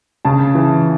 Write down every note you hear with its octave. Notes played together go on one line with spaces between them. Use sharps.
C#3 A5
E3